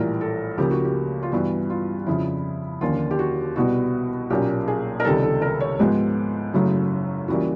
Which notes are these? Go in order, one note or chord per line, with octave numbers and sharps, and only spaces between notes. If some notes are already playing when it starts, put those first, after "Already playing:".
Already playing: A#1 A2 E3 G3 A#4
A4
C#2 C#3 F3 A#3 G4
F#4
G4
F4
G2 E3 G3 B3 F#4
F4
F2 C#3 F3 E4
D#2 D3 F3 A#3 C#4 F4
G4
F#4
C2 B2 G3 B3 F#4
B1 A#2 F#3 A#3 C#4 G4
G#4
A#4
C#2 C3 D#3 G3 A4
A4
A#4
C#5
G#2 F3 G#3 B3 G4
F#1 F#2 C#3 F#3 A3
C#2 C#3 E3 G3 A#3 F#4